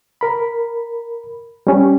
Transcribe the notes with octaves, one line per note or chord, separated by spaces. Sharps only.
A#4 B5
G3 C#4 G4